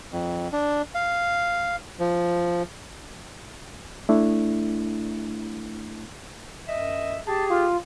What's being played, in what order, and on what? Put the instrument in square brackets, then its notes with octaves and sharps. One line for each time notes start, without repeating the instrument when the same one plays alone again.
[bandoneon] F2
D4
F5
F3
[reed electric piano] A3 D4 E4
[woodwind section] F#2 D#5 E5
[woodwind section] G4 G#4 [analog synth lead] A5
[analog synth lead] F4